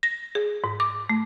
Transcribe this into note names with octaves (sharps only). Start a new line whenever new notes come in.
A#6
G#4
G#2
D6
A3